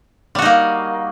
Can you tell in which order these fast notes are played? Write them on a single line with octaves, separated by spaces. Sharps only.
G3 F#4 D#4 A#3